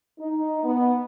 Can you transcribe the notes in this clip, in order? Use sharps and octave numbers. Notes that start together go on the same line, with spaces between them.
D#4
B3